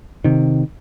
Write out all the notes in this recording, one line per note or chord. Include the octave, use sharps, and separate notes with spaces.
C3 D#3